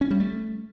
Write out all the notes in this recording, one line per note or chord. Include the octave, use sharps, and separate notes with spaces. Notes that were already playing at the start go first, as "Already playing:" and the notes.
C#4
G3
A3